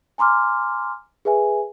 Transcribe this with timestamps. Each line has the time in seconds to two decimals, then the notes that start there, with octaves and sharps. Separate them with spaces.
0.18 G#5 A#5 C6 D6 F6
1.25 G#4 B4 E5 G#5